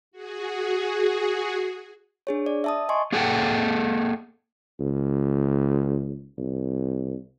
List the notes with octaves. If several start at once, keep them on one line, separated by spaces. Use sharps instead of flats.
F#4 G#4
D4 G#4 C#5
D5
E5 A5 D#6
D#5 G#5 C6 C#6
A#3 G#4 A4 F#5 G5
C#2
C2